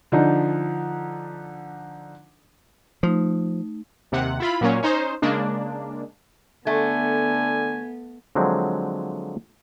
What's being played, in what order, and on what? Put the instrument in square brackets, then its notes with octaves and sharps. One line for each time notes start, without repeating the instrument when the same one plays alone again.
[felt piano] D3 F3 D4 D#4
[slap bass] F3 [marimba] A3 D#4
[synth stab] D#2 C3 F#5
E4 F4 B5
A#2 F#3 A#3 C#4
C#4 D#4 C5
C#3 G#3 A#3 D4
[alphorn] D3 [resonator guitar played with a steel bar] A3 [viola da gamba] B3 [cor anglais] G#5
[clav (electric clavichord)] D3 F3 F#3 G#3 C4